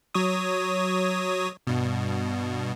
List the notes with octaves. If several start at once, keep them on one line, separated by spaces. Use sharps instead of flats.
F#3 C#5 D#6
G2 B2